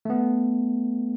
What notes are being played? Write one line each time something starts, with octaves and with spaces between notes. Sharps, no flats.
A3 B3